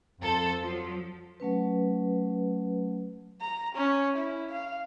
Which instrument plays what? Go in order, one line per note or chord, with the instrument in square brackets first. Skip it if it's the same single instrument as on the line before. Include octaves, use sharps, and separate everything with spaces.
[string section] F2 A4 C5
F3 F#3
[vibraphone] F#3 A3 C#4 B4
[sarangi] A#5
C#4
E4
F5